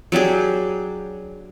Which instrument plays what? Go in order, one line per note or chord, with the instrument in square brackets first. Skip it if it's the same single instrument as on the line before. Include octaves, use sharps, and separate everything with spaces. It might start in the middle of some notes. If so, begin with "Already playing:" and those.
[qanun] F#3 D4 G4 G#4